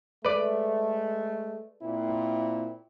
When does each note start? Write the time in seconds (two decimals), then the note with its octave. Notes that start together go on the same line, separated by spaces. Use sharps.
0.25 G#3 A3 B4 D5
1.81 A#2 C4 E4